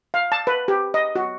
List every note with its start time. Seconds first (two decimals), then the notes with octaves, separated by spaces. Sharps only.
0.14 F5
0.32 A5
0.47 B4
0.68 G4
0.94 D#5
1.15 F#4